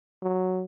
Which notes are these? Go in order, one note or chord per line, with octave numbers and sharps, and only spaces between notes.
F#3